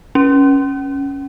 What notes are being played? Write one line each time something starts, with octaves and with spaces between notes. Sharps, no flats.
C#4